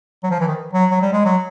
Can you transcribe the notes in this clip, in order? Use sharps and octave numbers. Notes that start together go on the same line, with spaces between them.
F#3
F3
E3
D#3
F#3
F#3
G3
G#3
F#3